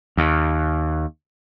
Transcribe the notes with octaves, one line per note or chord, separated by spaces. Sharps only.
D#2